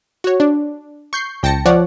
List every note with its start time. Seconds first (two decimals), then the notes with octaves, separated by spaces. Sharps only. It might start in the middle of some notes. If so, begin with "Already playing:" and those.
0.24 F#4 C#5
0.40 D4
1.13 C#6 G6 C7
1.43 C#2 G5 A5 A#6 C#7
1.66 F3 C#5 D5 F#5